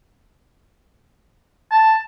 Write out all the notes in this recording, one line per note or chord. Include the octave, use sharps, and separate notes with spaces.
A5